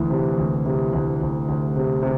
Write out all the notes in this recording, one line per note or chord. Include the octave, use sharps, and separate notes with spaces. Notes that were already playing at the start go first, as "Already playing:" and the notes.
Already playing: D2 E3
C3
D2
C3
D2
D2
D2
C3
C3